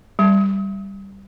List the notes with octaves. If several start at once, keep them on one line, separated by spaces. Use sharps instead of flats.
G3